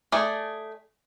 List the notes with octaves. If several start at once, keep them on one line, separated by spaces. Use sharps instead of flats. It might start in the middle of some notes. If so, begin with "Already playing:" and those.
A3 G#4 D5